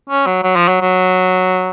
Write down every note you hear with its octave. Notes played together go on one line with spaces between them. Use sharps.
C#4
F#3
F#3
F3
F#3
F#3